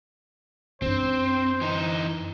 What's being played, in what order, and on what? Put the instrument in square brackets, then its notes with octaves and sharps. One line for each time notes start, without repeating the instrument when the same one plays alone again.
[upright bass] F#2 D4 [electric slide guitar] C4 [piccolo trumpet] C5
[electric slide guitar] E3 D#4